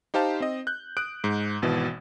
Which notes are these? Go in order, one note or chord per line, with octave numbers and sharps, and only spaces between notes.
D#4 G4 C5 F5 A5
C4 D#5
F#6 G6
D#6 F#6 D7
G#2
G#1 B2 E3